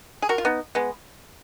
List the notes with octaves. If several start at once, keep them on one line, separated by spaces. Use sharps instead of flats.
G#4
F#4 A#4
F4
B3 D#4
G#3 B3